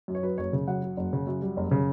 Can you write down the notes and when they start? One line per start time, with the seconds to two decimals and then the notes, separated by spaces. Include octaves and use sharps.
0.08 F#2
0.15 C#5
0.23 F#3 B4
0.38 F#1 C#5
0.53 C#3
0.68 F#2 F#5
0.83 F#3
0.97 F#1
1.13 C#3
1.27 F#2
1.42 G3
1.57 F#1
1.71 C#3